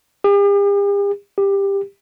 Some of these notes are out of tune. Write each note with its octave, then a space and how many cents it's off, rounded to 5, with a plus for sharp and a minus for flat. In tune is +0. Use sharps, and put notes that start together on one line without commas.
G4 +45
G4 +15